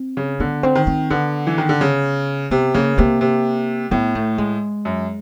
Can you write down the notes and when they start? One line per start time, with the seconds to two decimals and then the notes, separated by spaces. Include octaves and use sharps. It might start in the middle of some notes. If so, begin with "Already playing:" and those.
Already playing: C4
0.17 C#3
0.40 D3 B3
0.63 C4
0.75 D#3
0.87 C4
1.10 D3 B3
1.47 E3
1.58 D#3
1.69 D3
1.81 C#3
2.51 C3 B3
2.74 C#3 A#3
2.98 C3 A#3
3.21 C3
3.91 A2 B3
4.15 A3
4.38 G#3
4.85 F#2